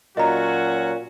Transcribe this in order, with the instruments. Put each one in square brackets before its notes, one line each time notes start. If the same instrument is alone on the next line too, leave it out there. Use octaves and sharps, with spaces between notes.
[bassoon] A#2 [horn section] F#3 C#4 F#4 [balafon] D#5 A#5